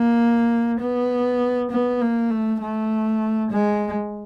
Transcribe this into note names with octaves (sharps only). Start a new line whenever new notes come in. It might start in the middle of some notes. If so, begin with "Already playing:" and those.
Already playing: A#3
B3
B3
A#3
A3
A3
G#3